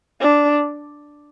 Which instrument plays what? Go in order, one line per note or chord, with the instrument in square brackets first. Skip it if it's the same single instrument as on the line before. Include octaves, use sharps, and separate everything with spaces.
[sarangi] D4